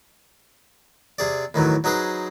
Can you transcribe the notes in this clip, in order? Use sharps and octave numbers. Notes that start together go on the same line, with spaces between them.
C3 G#4 D5
A2 D#3 E3 F#3
F#3 D#4 G#4 B4 C5